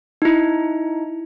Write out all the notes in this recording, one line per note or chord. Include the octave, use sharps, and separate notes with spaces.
D#4 E4